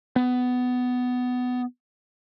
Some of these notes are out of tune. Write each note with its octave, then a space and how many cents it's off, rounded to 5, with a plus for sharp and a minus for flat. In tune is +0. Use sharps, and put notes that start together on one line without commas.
B3 +15